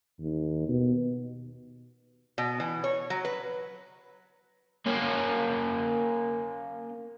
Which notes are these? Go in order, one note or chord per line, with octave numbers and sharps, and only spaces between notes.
D#2
B2
B2
E3
C#5
F#3
B4
A#3 C#4